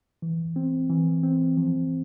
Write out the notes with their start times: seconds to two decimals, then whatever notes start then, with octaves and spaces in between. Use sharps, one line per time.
0.22 E3
0.56 C4
0.90 E3
1.23 C4
1.57 F3